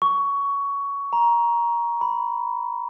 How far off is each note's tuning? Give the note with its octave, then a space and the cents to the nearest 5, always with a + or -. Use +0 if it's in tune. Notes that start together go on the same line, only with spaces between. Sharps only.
C#6 +15
A#5 +15
B5 +10